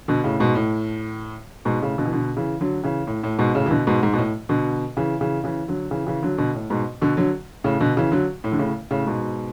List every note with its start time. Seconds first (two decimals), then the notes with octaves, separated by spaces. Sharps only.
0.08 B2 D3
0.24 A2 C#3
0.40 G#2 B2
0.55 A2
1.65 G#2 B2
1.81 A2 C#3
1.98 B2 D3
2.06 E3
2.13 B2 D3
2.37 C#3 E3
2.61 D3 F#3
2.84 C#3 E3
3.07 A2
3.23 A2
3.39 G#2 B2
3.55 A2 C#3
3.66 E3
3.71 B2 D3
3.87 G#2 B2
4.03 G#2
4.13 B2
4.18 A2
4.49 B2 D3
4.97 C#3 E3
5.21 C#3 E3
5.44 C#3 E3
5.68 D3 F#3
5.91 C#3 E3
6.07 C#3 E3
6.22 D3 F#3
6.38 B2 D3
6.55 A2
6.70 G#2 B2
7.02 B2 D3
7.17 D3 F#3
7.64 A2 C#3
7.80 B2 D3
7.97 C#3 E3
8.12 D3 F#3
8.44 A2
8.52 D3
8.59 A2 C#3
8.91 A2 C#3
9.07 G#2 B2